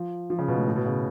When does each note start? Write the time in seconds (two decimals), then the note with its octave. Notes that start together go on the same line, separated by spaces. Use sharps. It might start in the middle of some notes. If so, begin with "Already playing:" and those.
Already playing: F3
0.30 F3
0.39 C#3
0.48 B2
0.57 A2
0.67 A2
0.76 B2
0.85 C#3